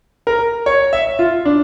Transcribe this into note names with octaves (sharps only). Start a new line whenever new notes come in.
A#4
C#5
E5
F4
D4